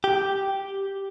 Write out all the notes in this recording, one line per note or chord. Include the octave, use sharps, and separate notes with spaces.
G4